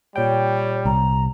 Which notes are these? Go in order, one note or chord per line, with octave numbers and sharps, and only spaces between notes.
A#2 G3 C#5 G5
C2 A#5